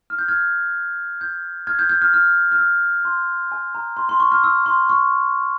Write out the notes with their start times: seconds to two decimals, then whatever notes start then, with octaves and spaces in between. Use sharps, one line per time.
0.10 F6
0.19 G6
0.28 F6 G#6
1.21 G6
1.67 F6 G#6
1.79 G6
1.89 G6
2.02 F6
2.14 F6
2.52 F6
2.58 E6
3.05 C6
3.52 G#5
3.75 A#5
3.97 C6
4.09 C6
4.20 C#6
4.32 F6
4.44 E6
4.66 C6
4.89 C#6